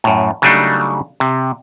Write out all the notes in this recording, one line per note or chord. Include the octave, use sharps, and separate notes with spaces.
F#2 A2
C#3 F#3 G3 A3 D4 D#4
C3